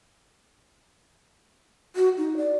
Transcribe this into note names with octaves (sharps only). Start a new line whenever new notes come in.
F#4
D#4
D5